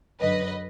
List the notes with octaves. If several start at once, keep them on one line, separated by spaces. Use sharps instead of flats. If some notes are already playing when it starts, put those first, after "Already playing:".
F#2 D3 F#3 B4 D#5